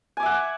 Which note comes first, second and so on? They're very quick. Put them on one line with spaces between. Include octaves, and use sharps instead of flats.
G#5 D6 E5 F#5